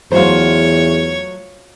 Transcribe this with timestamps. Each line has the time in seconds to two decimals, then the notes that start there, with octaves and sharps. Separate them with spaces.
0.12 E2 F#3 A3 F4 F#4 C5 C#5